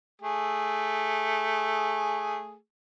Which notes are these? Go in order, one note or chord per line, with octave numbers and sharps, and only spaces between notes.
A3 G#4